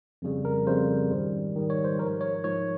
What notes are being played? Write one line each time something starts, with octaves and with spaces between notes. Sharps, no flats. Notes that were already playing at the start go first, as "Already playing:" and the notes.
F2 C#3 G3
A#4
F2 C#3 G3 C5
G#2 D#3 G3
G#2 D#3 G3
C#5
C5
G#2 F3 A#4
C#5
G#2 F3 C#5